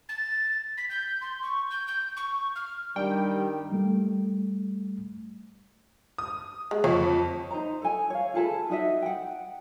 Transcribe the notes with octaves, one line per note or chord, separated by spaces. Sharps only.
A6
B6
G6
C6
C#6
G6
G6
C#6
F6
G2 D#3 G3 G5
G3 A3
D#6
G#3
F2 C#5
D#4 C5 A#5
A4 G#5
C#5 F5
F4 G#4 A4 B4
D#4 F#4 D#5 E5
F#5 G5